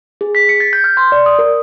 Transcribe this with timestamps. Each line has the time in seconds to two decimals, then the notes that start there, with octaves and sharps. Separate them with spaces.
0.21 G#4
0.35 B6
0.49 C#7
0.60 A6
0.73 G6
0.84 F6
0.97 C6
1.12 D5
1.26 D#6
1.39 A#4